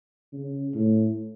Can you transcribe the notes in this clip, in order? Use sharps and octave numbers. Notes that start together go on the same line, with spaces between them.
C#3
A2